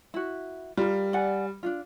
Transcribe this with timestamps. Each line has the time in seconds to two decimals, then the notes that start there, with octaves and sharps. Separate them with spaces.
0.14 E4 F#4
0.77 G3 F4 A#4
1.13 D5 F#5 G#5
1.63 D4 D#4 F4